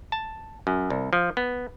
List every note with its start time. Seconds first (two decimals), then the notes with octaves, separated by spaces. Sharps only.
0.12 A5
0.67 F#2
0.90 C2
1.13 F3
1.37 B3